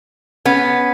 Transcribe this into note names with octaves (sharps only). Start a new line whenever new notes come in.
B3 C#4